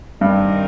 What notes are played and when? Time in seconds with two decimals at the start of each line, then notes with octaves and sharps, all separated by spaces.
0.21 G2 D#3 C4 D#4 A#4